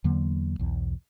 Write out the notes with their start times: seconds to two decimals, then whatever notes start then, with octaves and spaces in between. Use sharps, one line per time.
0.04 E2 D3 F#3 A#3
0.59 B1 E2